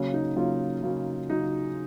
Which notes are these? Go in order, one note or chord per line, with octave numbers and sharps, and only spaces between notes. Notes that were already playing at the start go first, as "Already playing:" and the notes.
Already playing: C#3 F#3 A#3 C#4
D#4
C#3 F#3 A#3 C#4 F4
C#3 F#3 A#3 C#4
C#3 F#3 D#4